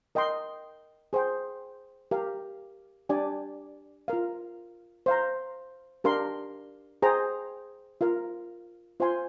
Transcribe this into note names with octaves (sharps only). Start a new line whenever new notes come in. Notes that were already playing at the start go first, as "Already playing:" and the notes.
A#4 D#5 G5 C6
G#4 C5 G5
G4 A#4 F5
D4 G4 D5 G#5
F4 A#4 F5
C5 F5 A#5
D4 G4 A#4 F5 C6
G#4 C5 G5 A#5
F4 A#4 F5
F4 C5 F5 G#5 C6